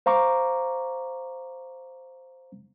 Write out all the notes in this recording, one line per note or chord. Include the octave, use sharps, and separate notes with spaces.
C5 F5 A#5 C#6 D6